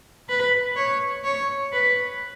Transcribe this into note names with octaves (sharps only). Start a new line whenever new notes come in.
B4
C#5
C#5
B4